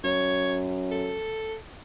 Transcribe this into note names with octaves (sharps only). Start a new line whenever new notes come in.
F#2 C#5
A4